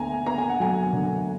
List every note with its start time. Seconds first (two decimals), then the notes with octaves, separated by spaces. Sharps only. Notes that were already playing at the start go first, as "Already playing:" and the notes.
Already playing: D2 B3 G#5 A#5
0.26 B3 A#5
0.38 G#5
0.49 F#5
0.60 F#3 G#5
0.93 D3